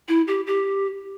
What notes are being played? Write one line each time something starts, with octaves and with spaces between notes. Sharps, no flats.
E4
G4
G4